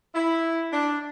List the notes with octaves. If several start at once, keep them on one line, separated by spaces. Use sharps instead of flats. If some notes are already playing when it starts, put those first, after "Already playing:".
E4
D4